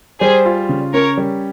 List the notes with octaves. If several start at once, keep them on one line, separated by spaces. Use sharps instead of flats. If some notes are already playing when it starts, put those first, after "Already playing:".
G3 G#4 C5
F4
C#3
C#4 A#4 C#5
G3